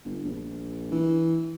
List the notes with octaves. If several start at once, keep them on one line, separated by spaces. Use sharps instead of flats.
G1
A#1
E3